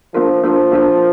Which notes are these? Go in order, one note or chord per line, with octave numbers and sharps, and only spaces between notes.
F3 A#3 D4 F4 A#4
F3 A#3 D4 F4 A#4
A#3 D4 F4 A#4